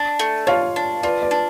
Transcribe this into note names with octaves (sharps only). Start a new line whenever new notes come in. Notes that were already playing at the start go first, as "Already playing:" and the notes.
Already playing: D4
A3
F4 C#5 F5
D4
F4 B4 D5
B4 D5
D4